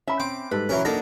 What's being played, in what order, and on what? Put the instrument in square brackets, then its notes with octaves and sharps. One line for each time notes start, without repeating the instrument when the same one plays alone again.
[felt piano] C#4 B5 [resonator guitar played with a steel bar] E5
[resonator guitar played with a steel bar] C4 [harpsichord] D6
[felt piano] G#2 G3 A4 [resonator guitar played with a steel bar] B4
[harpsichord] E3 F#3 A#4 [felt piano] C#4
[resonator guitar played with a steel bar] F#3 D4 [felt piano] A#3 D#4 A#6 [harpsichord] A4 A#4